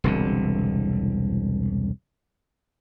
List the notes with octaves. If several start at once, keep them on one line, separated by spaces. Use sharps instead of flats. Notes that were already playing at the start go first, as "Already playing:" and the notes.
E1 C2 D3